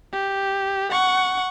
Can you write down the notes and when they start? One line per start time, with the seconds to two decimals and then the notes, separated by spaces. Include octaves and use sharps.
0.12 G4
0.91 F#5 C#6